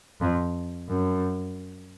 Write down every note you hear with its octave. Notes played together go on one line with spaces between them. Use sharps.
F2
F#2